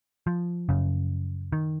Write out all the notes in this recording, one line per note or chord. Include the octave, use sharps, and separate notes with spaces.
F3
F#2 C#3
D#3